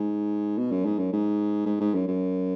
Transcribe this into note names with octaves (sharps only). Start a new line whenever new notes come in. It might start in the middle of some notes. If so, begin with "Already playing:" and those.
Already playing: G#2
B2
F#2
G#2
F#2
G#2
G#2
G#2
F#2
F#2